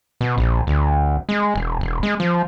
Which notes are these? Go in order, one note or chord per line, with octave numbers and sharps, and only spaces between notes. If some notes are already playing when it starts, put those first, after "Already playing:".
B2
A#1
D2
G#3
E1
E1
G#3
F3